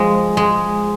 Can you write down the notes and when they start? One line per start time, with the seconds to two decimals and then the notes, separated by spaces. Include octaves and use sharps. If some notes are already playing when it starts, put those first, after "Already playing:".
Already playing: F3 G#3
0.37 G#3